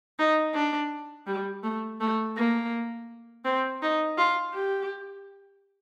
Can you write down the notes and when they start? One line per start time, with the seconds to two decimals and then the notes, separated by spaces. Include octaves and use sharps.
0.19 D#4
0.54 D4
1.27 G3
1.64 A3
2.01 A3
2.37 A#3
3.45 C4
3.82 D#4
4.18 F4
4.54 G4